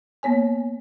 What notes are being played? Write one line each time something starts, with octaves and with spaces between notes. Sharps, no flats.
A#3 B3 C#5 G#5